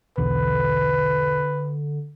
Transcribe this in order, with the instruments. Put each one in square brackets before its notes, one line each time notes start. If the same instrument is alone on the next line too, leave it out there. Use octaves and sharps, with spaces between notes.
[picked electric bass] B1 E2 [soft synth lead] D3 [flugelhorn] B4